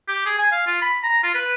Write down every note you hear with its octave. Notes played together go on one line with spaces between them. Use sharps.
G4
G#4
G#5
F5
F4
B5
A#5
F4
B4